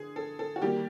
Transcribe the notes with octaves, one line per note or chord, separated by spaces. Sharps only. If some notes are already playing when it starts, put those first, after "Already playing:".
Already playing: D3 G#4
A4
A4
F#4
D#3 G3 A#3 G4